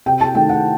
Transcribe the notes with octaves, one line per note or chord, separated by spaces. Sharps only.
C3 G5
A5
D#3 A3 G5
F#5